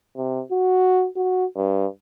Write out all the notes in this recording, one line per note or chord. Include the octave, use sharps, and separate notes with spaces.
C3
F#4
F#4
G2